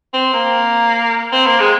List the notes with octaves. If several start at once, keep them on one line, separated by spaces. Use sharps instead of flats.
C4
A#3
C4
A#3
G#3